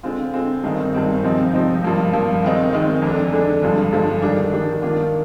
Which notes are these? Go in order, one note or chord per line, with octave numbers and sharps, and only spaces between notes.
D3 G#3 C4 F4
D3 G#3 C4 F4
G2 D#3 G#3 C4 D#4
G2 D#3 G#3 C4 D#4
C3 F3 C4 D#4
C3 F3 C4 D#4
G2 F3 A#3
G2 F3 A#3
D#3 G#3 C4 D#4
D#3 G#3 C4 D#4
F2 D3 G#3 D4
F2 D3 G#3 D4
G2 D3 F3 G#3
G2 D3 F3 G#3
D#3 G3 D4
D#3 G3 D4
D#3 A#3 D4 F4